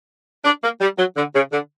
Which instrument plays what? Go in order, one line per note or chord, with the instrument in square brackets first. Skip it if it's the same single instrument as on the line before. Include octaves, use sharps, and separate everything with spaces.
[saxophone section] D4
A#3
G3
F#3
D3
C#3
D3